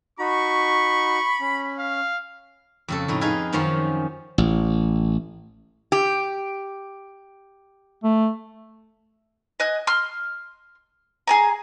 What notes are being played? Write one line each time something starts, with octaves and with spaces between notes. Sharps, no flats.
D#4 F#4 B5 C#6
C#4
F5
F2 C#3 A4
F2 A2 D#4
D#4 G#4 B4 F5 G#5
F#2 D#3 F3 C#4 A#5 C6
A1
G4
A3
D#5 G#5 F#6
C6 F6
G#4 G#5 A#5